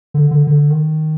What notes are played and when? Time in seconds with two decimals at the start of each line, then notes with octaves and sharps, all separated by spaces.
0.14 D3
0.31 D3
0.47 D3
0.70 D#3